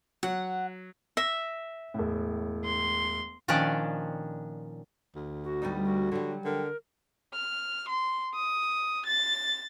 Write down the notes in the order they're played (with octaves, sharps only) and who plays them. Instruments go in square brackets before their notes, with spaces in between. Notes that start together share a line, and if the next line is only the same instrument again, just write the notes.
[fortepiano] F#3 [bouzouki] F#5
[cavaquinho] E5 [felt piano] A#6
[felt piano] E1 A2
[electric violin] C6
[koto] A#2 D#3 F3 C#4 D4 D5
[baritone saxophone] D2
[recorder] F#4
[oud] G3 B3 D#4
[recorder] F#4
[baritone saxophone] D3 [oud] F#3 G3
[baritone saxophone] D3 [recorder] A#4
[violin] F6
C6
D#6
A6